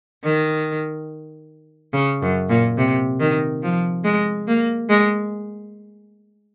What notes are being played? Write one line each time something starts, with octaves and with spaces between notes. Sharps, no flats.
D#3
C#3
F#2
A#2
C3
D#3
F3
G#3
A#3
G#3